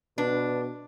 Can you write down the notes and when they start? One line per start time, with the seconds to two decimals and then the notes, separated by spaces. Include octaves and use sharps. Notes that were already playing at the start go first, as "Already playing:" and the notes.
0.18 B2 D4 B4